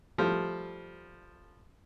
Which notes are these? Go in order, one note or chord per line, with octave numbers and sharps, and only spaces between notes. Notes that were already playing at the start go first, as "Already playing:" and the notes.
F3 G3 A3